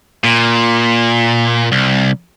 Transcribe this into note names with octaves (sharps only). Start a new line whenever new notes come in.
A#2
C2